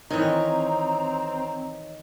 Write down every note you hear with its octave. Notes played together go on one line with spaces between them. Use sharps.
D#3 E3 C4 C#5 D#5 A#5